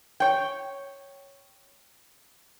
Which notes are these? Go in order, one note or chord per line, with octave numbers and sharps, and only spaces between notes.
C#5 G5